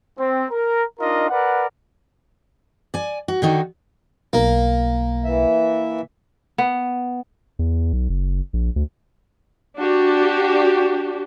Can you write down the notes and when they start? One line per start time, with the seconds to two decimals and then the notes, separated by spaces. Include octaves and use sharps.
0.18 C4
0.50 A#4
1.00 D4 D#4 F4 A#4 D#5
1.30 A#4 B4 D5 F#5
2.94 D5 G#5
3.28 F#4
3.42 D3 D#3 D#4 F#4
4.33 B1 A#3
5.25 E3 E5
6.58 B3
7.59 E2
7.93 B1
8.09 F#1
8.53 A#1
8.76 D2
9.78 D4 F#4 G4